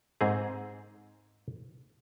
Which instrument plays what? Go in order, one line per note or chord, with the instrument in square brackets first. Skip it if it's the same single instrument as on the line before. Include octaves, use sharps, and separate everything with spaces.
[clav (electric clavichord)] G#2 C4 G#4